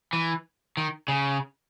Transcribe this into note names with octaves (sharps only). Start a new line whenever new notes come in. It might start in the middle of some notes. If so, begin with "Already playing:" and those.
E3
D#3
C#3